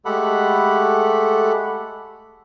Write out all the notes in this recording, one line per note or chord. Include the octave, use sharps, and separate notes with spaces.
G#3 A3 G4 A4 F#5 B5